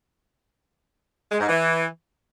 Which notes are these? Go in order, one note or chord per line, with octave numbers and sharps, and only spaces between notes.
G#3
G#2
E3